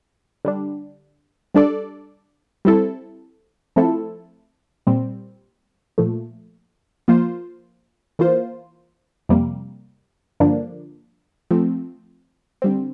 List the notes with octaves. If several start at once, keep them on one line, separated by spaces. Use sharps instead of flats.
D3 G3 D4
G3 D4 A4 D5
G3 C4 E4 A4
F3 A3 C4 E4 A4
A#2 G3 C4
A#2 F3 A3
F3 A#3 F4 C5
E3 A#3 F4 C5
F2 C3 G3 A#3
G2 D3 F3 A#3 D4
F3 A3 C4
D3 G3 C4